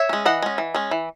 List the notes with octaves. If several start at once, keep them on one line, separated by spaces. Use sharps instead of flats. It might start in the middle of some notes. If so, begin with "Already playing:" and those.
Already playing: C#5 E5
G#3 C#4
E3 D#5 F#5
G#3 C#4
E3
G#3 C#4
E3